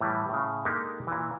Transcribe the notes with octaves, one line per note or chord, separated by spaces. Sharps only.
A2 E3 G3
A2 C#3
G#3 A#3 D4 D#4 G4 A4
A#2 E3